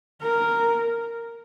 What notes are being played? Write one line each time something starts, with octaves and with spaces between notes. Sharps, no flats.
A#4